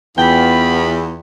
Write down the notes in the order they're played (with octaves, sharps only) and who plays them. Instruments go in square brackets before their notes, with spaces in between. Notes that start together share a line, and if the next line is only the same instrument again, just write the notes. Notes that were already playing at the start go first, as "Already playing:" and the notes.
[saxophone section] E2 [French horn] B3 [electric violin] F4 B5 [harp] G5